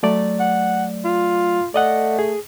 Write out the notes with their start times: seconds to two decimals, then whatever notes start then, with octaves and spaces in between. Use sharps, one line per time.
0.03 F#3 A3 D5
0.40 F#5
1.05 F4
1.74 A3 D5 D#5 F#5
2.19 G#4